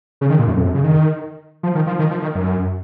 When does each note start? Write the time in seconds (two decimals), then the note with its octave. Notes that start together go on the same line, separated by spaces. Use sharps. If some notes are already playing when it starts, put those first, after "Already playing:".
0.21 C#3
0.30 D#3
0.39 A#2
0.47 F#2
0.57 F2
0.65 F#2
0.74 C#3
0.84 D#3
1.63 F3
1.75 D#3
1.87 F3
1.99 D#3
2.11 F3
2.22 D#3
2.35 F#2